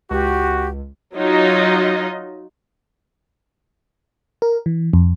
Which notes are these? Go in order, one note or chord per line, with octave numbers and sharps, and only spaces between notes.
C#2 F#4 G4
F#3 D#4 F4 D#5
A#4
E3
F2